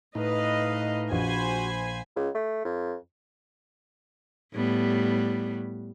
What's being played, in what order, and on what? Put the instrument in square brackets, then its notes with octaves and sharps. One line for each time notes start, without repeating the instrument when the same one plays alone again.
[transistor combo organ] A2 D#4 [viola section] B4 D#5 F5
[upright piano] A#1 [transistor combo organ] F#4 [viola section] C5 G#5 B5
[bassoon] C#2
A3
F2
[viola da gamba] A2 G3 B3